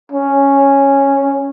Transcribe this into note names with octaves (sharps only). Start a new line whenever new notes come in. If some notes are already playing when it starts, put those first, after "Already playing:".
C#4